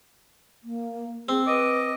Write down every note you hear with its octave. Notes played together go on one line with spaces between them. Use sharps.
A#3
C4 G#4
B4 D#5 D6